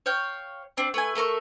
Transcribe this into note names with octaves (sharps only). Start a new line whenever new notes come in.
C#5 F5 G5
C4 D4
A3 B4 G#5
A3 A4 A#4 C#6